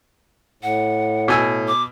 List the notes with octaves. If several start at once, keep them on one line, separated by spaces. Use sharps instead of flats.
A2 F#5
B2 G#5 E6
D6